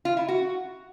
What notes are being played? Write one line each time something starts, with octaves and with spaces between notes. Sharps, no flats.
F4
E4
F#4